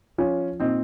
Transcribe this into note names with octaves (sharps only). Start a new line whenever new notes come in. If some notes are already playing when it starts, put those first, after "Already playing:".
F3 C#4 F4
A#2 C4 D#4